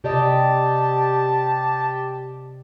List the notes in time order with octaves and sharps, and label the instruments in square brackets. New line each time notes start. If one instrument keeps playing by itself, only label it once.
[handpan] C3 D5 D#5 [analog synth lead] G4 [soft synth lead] A5